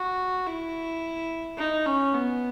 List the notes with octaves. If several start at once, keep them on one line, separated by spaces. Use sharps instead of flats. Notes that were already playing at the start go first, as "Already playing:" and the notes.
Already playing: F#4
E4
D#4
C#4
B3